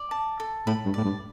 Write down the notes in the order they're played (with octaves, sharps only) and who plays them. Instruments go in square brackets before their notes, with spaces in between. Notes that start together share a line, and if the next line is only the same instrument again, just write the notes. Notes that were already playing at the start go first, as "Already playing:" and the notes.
Already playing: [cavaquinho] D5
A5
A4
[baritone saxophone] A2 [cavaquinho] B5
[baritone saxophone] G2
[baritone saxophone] A2 [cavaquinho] D5
[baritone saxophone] G2